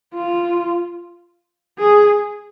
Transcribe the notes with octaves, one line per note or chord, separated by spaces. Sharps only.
F4
G#4